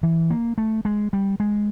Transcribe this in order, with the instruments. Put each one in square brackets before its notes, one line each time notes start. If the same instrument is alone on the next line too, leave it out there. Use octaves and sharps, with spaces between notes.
[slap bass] E3
A#3
A3
G#3
G3
G#3